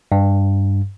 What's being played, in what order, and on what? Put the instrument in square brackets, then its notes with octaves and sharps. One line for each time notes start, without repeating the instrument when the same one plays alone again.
[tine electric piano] G2